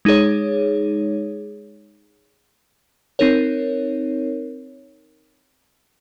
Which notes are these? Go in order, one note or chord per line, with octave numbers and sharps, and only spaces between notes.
G#3 D#4 G#4 C#5
C4 D#4 A#4 C#5